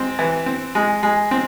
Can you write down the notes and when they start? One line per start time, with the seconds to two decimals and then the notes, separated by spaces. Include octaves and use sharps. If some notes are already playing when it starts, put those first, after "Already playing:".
Already playing: G#3 C4
0.19 E3
0.46 C4
0.75 G#3
1.03 G#3
1.31 C4